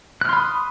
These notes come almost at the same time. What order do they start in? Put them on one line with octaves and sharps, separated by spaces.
F#6 F6 C6 B5 D#6